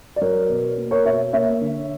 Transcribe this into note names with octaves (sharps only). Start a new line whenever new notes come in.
D5
F#3 A#4 C#5
B2
A#3
A#4 C#5
B2 C#5 E5
A#3 C#5 E5
D3